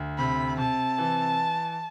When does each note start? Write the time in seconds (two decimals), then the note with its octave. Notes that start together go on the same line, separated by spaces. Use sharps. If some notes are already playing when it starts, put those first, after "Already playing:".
Already playing: D2
0.18 C3 B5
0.58 C3 A5
0.98 E3